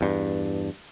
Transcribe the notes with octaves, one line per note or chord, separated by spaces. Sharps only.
E2 G2